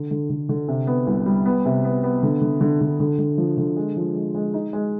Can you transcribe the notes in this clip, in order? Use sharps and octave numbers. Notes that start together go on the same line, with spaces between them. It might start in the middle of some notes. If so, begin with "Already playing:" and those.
Already playing: D3
D3
D3
D3
C3
B3
C2
G3
B3
C3
B3
B3
D3
D3
D3
D3
D3
D3
F3
D3
G#3
F3
G#3
G#3
D#4
G#3